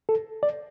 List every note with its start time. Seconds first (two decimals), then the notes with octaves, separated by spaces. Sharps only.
0.09 A4
0.43 D5